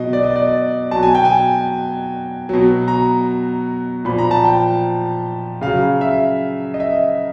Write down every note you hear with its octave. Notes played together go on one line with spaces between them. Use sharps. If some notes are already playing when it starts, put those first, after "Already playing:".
Already playing: B2 F#3 D#5
D5
D#5
D5
B2 F#3 A5
G#5
G5
G#5
B2 F#3
A#5
A#2 F3 B5
A#5
A5
G5
C#3 F#3 F5
E5
D#5
E5